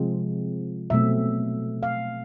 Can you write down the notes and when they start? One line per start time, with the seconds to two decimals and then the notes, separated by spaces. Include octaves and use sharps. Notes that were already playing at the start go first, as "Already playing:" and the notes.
Already playing: C3 F3 G#3 C4
0.90 B2 F#3 A3 C4 E5
1.83 F5